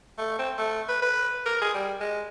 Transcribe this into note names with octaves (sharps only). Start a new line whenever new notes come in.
A3
C4
A3
B4
B4
A#4
G#4
G3
G#3